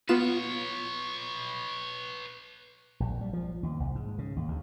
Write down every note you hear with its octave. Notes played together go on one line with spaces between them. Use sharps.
B3 F4 B4 C#5 E7
A#1
G3
F3
D#2
C2
G#2
C#3
D#2
D2